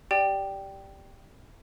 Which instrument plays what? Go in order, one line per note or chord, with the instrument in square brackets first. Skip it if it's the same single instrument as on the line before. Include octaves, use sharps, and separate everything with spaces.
[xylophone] G4 D5 G5